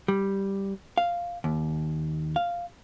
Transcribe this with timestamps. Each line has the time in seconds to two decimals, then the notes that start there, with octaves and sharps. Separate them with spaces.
0.08 G3
0.98 F5
1.44 D#2
2.36 F5